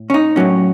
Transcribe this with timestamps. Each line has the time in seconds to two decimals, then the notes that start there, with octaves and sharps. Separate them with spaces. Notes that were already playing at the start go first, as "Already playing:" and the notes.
Already playing: A2
0.10 C#4
0.14 D#4
0.36 A2 F#3 C#4